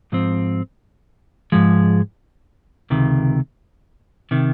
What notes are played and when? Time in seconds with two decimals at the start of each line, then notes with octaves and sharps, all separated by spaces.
0.12 G#2 F3 C4
1.52 G#2 F3 G#3
2.90 C#2 C3 D#3
4.31 C3 D#3